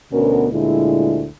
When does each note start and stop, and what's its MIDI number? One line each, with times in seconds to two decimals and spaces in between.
0.12 0.47 38
0.12 0.47 47
0.12 0.47 59
0.12 0.47 61
0.12 0.47 66
0.12 0.47 70
0.52 1.26 38
0.52 1.26 46
0.52 1.26 50
0.52 1.26 56
0.52 1.26 64